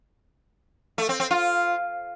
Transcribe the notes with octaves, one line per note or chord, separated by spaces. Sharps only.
A3
C4
C4
F4